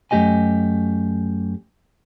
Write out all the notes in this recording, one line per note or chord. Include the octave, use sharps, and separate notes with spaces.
F#2 A3 G4 D#5 G#5